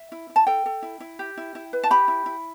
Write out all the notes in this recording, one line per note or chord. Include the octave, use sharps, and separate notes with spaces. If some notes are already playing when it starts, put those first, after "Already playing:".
Already playing: E5
E4
E4
A5
A4 G5
A4
E4
E4
G4
E4
E4
B4
A5
G4 B5
E4
E4